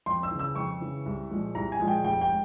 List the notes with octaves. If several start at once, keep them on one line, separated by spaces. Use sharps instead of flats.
F2 C6
E6
C#3 E3
E6
F2 C#6
C#3 E3
C2
A#2 F3 G#3
C2 A#5
G#5
A#2 F3 G#3
G5
F1 G5
G5
G#3